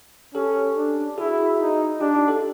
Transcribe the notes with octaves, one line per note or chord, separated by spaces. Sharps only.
C#4 G4 A4
D4
E4 F#4 G#4
D#4
D4 F4 G4
D#4 F4
G4 A4